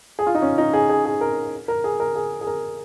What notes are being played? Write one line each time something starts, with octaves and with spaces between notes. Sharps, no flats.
G#4
F4
D#4
C#4
D#4
G#4
G#4
G#4
A#4
A#4
G#4
A#4
G#4
G#4
A#4